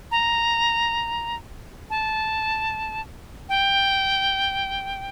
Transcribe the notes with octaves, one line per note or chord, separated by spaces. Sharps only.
A#5
A5
G5